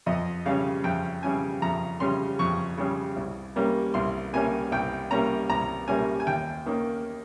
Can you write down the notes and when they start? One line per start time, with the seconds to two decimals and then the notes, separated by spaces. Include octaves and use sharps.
0.06 F2 D#5
0.45 C#3 G3 C#4 F5
0.84 F2 G5
1.23 C#3 G3 C#4 G#5
1.62 F2 A#5
2.00 C#3 G3 C#4 C6
2.39 F2 C#6
2.78 C#3 G3 C#4
3.17 C2
3.55 C3 G3 A#3 C#4
3.94 C2 C6
4.33 C3 G3 A#3 C#4 G#5
4.72 C2 G5
5.11 C3 G3 A#3 C#4 A#5
5.49 C2 A#5
5.88 C3 G3 A#3 C#4 G#5
6.20 G#5
6.27 D#2 G5
6.66 D#3 A#3 C#4